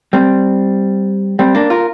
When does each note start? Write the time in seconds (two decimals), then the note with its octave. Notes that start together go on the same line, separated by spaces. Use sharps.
0.13 G3 C4
1.39 G3 C4
1.55 A#3 D4
1.70 F4 A#4